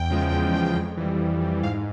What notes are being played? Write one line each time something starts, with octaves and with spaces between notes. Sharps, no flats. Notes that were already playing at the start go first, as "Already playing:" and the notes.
Already playing: E2 G5
C#3 F3 G#3
E2
C#3 F3 G#3
F2
E3 G3
F2
E3 G3
G#2 F5